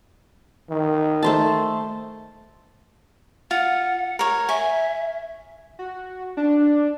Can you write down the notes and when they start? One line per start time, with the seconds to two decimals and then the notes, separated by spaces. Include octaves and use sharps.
0.70 D#3
1.23 A3 C5 A5
3.51 F4 F#5
4.19 A#4 C#5
4.49 E5 G#5
5.79 F#4
6.37 D4